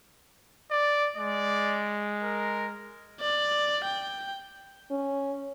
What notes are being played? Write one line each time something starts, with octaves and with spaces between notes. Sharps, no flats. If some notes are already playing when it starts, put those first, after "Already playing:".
D5
G#3 D5
A#4
D5
G5
C#4